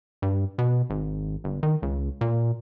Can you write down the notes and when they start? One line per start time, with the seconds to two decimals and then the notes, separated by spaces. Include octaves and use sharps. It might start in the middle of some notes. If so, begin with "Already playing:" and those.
0.22 G2
0.58 B2
0.90 G#1
1.44 G1
1.63 D#3
1.82 C#2
2.21 A#2